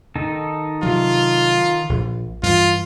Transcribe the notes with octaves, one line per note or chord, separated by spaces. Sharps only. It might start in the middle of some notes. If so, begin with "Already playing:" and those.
D#3 D#4 A4
C3 F#3 F4
A#1
G2 E3 F4